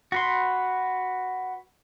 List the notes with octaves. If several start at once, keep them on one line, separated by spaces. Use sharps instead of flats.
F#4 B4 C6